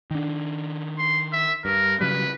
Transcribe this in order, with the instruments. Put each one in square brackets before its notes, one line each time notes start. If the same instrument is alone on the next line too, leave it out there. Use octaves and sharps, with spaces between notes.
[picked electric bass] D#3 D4
[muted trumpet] C6
E5
[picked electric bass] G2 [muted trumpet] A#4
[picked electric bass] C#3 F#3 G3 [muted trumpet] B4